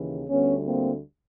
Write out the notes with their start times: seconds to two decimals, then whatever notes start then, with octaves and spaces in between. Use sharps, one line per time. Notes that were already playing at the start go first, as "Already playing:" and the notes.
Already playing: D#2 C#3 E3
0.29 D2 D3 G3 B3 C#4
0.65 A#3 C4